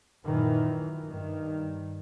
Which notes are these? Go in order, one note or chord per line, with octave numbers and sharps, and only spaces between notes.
F#2 A#2 D#3 E3
G2 D#3